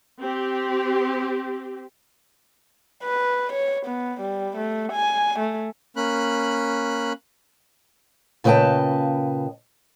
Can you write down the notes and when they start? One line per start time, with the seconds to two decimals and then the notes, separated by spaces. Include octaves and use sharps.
0.21 C4 G4
3.04 B4
3.52 C#5
3.86 B3
4.21 G3
4.56 A3
4.92 G#5
5.39 A3
5.96 A#3 C#4 B5 F#6
8.44 A#2 C#3 B4 D#5 G5 A5